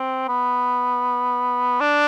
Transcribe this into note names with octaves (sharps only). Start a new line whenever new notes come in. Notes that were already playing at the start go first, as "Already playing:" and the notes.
Already playing: C4
B3
D4